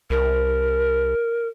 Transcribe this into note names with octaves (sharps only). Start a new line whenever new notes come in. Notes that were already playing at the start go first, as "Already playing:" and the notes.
C2 A#4